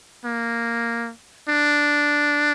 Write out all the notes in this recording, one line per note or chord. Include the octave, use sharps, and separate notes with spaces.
A#3
D4